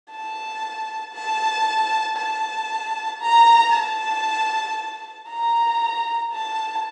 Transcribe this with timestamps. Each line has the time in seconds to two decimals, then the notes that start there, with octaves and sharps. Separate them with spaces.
0.11 A5
1.14 A5
2.17 A5
3.22 A#5
3.73 A5
5.28 A#5
6.32 A5